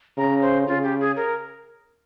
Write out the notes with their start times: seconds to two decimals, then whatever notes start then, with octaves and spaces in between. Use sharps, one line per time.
0.17 C#3 A#5
0.41 C5
0.67 C#3 F4
0.83 G4
1.00 G#4
1.16 A#4